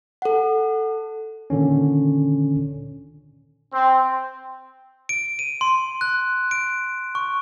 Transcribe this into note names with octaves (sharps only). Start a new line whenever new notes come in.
A4 F#5
A#2 D3 D#3 C#4
C4
D7
D#7
C6
F#6
D7
C#6